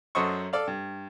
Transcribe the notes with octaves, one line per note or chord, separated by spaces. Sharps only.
F#2 F#3 A4 C5 D#5 C#6
A4 D5 F5
G2